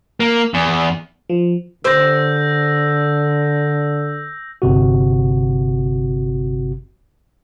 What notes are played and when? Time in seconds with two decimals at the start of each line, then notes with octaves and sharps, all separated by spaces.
0.20 A#3
0.54 E2
1.30 F3
1.84 D3 G4 C5 E6 G6 A#6
4.62 G1 C3 F#4